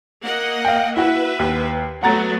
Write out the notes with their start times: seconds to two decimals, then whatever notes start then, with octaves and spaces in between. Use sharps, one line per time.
0.23 A#3 D#5 F#5
0.65 F5 G5
0.97 E4 F#4 B4 E5
1.39 D#2
2.03 F#3 A3 B3 F#5 A#5 A6